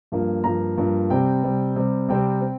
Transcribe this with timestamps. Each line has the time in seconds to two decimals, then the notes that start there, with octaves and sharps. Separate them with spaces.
0.12 G2 F3 A#3
0.44 G2 F3 A#3 A#5
0.78 G2 F3 A#3
1.10 C3 G3 C4 G5
1.44 C3 G3 C4
1.76 C3 G3 C4
2.09 C3 G3 C4 G5
2.42 C4